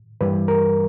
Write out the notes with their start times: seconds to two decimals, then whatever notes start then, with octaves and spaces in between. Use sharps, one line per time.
0.21 G2 E3 G3 B4
0.48 A#4